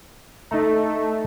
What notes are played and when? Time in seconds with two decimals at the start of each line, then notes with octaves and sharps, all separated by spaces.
0.51 A3 D#4 A5 A#5